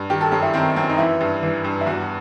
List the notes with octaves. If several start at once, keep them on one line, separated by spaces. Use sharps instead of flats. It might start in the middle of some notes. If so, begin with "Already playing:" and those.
Already playing: G2
D#3 G4
A4
F#2 G4
E4
D#3 C4
F#2 C4
D#4
E3 E4
G2
E3
G2
E4
E2 F#4